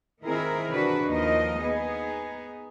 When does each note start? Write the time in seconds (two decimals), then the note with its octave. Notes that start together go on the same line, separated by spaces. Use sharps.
0.25 D#3 C4 E4 G#4 A#4
0.71 C3 E3 D4 F#4 B4
1.07 D#2 F3 D#4 A#4 D#5
1.62 B3 D#4 G#4